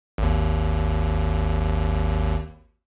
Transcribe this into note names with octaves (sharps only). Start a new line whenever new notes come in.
G#1 D#2